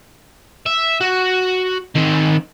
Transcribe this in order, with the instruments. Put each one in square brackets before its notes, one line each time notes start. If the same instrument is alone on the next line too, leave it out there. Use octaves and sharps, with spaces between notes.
[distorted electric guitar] E5
F#4
D#3 C4